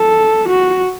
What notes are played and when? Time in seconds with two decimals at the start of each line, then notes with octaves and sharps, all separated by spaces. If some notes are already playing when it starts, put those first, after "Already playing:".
Already playing: A4
0.49 F#4